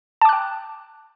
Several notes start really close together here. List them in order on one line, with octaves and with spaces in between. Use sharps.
A5 D6 F#6 G5